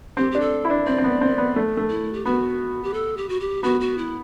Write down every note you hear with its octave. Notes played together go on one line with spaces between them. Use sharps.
C4 G4
D4 G4
A4
E4
D4
C4 D5
C4
B3
C4
B3
A3
A3
E4
G4
B3 F#4
G4
A4
G4
F#4
G4
B3 F#4
F#4
E4